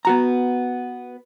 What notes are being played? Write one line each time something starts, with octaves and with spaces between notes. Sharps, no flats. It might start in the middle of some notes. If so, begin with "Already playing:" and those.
B3 F#4 A#5